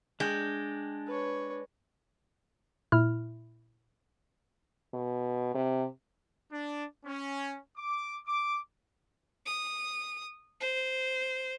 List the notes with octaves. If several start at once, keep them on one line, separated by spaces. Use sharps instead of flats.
G#3 D4 G5
B4 C#5
A#2 E4 F6
B2
C3
D4
C#4
D6
D6
D#6
C5